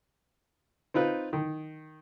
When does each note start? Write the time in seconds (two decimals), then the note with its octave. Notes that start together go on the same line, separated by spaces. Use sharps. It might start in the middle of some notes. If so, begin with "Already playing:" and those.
0.94 C4 D#4 F4 B4
1.33 D#3